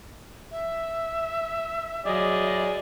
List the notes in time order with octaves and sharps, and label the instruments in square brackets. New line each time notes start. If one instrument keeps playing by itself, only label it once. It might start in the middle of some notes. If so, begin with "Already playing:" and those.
[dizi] E5
[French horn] F#3 [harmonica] G#4 D5 [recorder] D#5